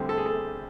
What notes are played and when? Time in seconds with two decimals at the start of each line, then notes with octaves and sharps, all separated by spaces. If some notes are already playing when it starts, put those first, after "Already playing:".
Already playing: D2 D3 G3 C4
0.09 A4
0.17 G#4
0.26 A4